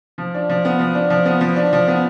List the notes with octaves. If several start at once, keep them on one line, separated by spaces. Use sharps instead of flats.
F3
D4
F3
B3
F3
D4
F3
B3
F3
D4
F3
B3